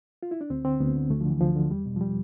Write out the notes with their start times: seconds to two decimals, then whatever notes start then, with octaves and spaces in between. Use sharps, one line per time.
0.23 F4
0.31 E4
0.41 D4
0.50 D2 C4
0.65 D3 C4
0.81 D2 B3
0.95 D3
1.10 D2 A3
1.21 F3
1.25 D3 E3
1.41 D2 F3
1.56 D3
1.70 E2 G3
1.86 B2
1.96 F3
2.01 G3